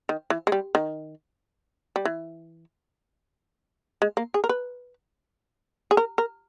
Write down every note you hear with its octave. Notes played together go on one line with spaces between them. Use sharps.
D#3
E3
G#3
G3
D#3
G3
E3
G#3
A#3
G#4
A#4
B4
G#4
A#4
A#4